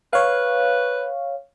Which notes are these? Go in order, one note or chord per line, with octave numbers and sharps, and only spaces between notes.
B4 C#5 F5